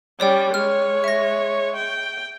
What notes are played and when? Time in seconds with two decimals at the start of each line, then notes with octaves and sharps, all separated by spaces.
0.20 G3 C#4 C#5 D5 G5
0.54 G#3 C#5 F6
1.04 E5 A#6
1.76 G5